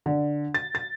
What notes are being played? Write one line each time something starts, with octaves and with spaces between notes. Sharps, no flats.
D3
A6
A6